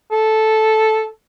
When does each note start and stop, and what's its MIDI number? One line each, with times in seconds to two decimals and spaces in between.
0.12 1.07 69